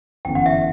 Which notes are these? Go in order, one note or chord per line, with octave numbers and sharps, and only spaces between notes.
G1 F#2 E3 B3 E4 G5
F#5
E5